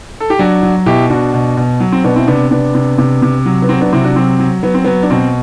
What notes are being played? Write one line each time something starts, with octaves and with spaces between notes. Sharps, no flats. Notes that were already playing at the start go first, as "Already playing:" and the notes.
A4
G4
F#3 D4 F#4
F#3
B2 E4 G4
B2 D4 F#4
B2
B2
F#3
C4
B2 B3 D4
C4 E4
C3 B3 D4
C3 B3 D4
C3
C3
C3
F#3
B3
F#3 C4
B3 D4
C3 C4 E4
D4 F#4
F#3 C4
F#3
F#3 B3
C4
F#3 B3
D4
B2 C4